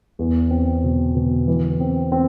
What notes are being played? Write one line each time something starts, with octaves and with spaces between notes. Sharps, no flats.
E2
C4
B2
B2
E3
C4
C4